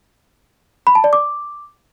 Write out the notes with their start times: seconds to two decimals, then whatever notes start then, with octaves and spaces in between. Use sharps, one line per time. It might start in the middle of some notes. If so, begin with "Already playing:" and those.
0.87 B5
0.95 A5
1.04 D5
1.13 D6